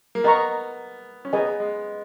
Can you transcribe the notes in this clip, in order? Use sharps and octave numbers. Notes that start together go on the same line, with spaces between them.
A#3
B3 A#4 D#5 A#5 C#6
C#4
B3 G#4 B4 D#5 G#5
G#3